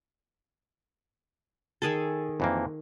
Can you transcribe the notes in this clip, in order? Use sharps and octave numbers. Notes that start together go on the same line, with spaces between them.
D#3 G#4 A4 A5
F2 E3 A#3